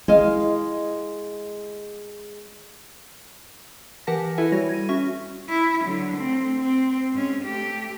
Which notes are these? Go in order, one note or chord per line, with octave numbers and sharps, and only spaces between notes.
G#3 E4 D#5 F5
E3 G4 A#4 F#5 A5 A#6
E4 A4 B4 E5 G#5
G3 F#4 C#5 A#6
G#6 D#7
C#4 F#4 E5 C#6
E4
D3 F#3
A3 C4
C4
G#2 C#4
A3 G4